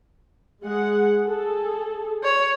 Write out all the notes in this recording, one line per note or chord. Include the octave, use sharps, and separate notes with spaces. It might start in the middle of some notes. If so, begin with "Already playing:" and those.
G#3 G#4 F#5
G#4 A4
C#5